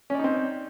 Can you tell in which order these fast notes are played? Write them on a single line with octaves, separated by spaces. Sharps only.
C#4 D5 D#4 C4